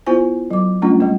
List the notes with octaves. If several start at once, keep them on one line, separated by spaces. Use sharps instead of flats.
B3 E4 F4 C5 G#5
F#3 D6
G3 A3 A#3 C#4 D4 F4
G3 A#3